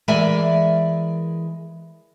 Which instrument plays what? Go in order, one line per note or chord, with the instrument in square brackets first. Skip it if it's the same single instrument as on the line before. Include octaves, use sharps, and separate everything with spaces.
[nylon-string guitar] E3 G#3 A#4 D5 E5 G#5